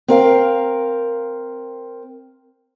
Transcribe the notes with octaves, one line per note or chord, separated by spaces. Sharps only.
C4 A#4 F5